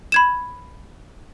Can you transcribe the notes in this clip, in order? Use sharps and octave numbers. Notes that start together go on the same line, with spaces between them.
B5 G#6 E7